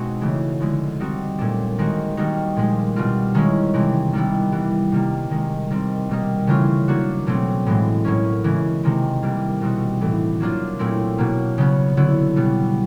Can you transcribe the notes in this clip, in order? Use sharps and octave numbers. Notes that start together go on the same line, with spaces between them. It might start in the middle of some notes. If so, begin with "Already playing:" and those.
Already playing: B2 G#3 C4 D#4 F#4
C#3 E3 A3
D3 F3 G#3 B3
G3 C4 D#4 F#4
A#2 F#3 A3 D4
D#3 G#3 C4 D#4 F#4
D#3 G3 A#3 D#4 F#4
A#2 F3 G#3
B2 G3 C4 F4
D#3 G#3 C#4 E4
C3 E3 G#3 C4
D#3 G3 B3 E4
E3 G3 B3
C3 D#3 G3 A#3
C3 D#3 G#3
D#3 G3 C4
B2 G3 A#3 D#4
C#3 E3 A3 C#4 F4
F#3 A#3 D4 F#4
B2 F#3 A3 C4
A2 E3 G#3
A2 F#3 A#3 C#4
C#3 E3 G#3 C#4
C3 D#3 G#3 C4
E3 G3 A#3
B2 G3 C4 D#4 F#4
A2 E3 A3 D4
F#3 A#3 D4 F4
A#2 F#3 A3 C4 E4
B2 F#3 A#3
C#3 F#3 B3
D3 F#3 B3 E4
B2 G3 B3